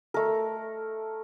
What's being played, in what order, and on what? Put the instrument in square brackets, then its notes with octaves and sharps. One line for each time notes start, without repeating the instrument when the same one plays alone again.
[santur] A3 A#4